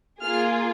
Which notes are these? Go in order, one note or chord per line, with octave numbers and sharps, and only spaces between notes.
A#3 F4 G#4 F6